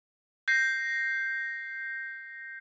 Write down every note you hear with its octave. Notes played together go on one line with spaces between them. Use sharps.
G6 A#6 C7